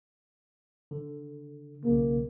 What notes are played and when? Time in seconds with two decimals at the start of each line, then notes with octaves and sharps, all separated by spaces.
0.91 D3
1.84 B1 C#3 A#3